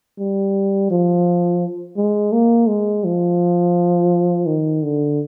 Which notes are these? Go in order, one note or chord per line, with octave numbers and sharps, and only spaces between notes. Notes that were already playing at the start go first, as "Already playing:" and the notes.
G3
F3
G#3
A#3
G#3
F3
D#3
D3